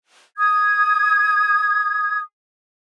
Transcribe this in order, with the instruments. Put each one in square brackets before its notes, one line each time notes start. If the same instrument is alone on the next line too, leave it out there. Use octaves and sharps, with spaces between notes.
[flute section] D#6 G#6